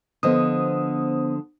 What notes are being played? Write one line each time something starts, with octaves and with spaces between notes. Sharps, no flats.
D3 F3 B3 C5 D#5 D#6